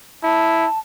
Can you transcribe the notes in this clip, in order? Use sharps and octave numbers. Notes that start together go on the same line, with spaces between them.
E4 A5